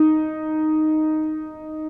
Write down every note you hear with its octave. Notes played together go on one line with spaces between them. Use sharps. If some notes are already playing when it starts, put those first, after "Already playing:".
Already playing: D#4